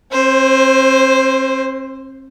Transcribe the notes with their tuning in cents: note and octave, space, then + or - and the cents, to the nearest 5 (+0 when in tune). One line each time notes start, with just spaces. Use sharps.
C4 +40 C5 +0